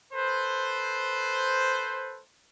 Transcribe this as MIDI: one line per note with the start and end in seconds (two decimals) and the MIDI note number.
0.13 2.20 69
0.13 2.20 71
0.13 2.20 72